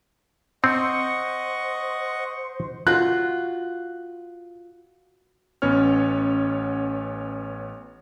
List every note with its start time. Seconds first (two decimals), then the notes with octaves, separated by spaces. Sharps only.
0.64 C4 C5 D#5 F#5 C#6
2.87 F4 F#4 F#6
5.62 A1 B3 C#4 C#5 F6